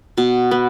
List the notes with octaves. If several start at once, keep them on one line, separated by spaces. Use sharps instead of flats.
B2
B3